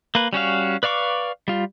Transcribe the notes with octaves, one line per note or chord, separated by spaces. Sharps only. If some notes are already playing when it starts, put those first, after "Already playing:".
A#3 B4
G3 C#4 F#4 F5
B4 D5 F5 C#6 D6
G3 F4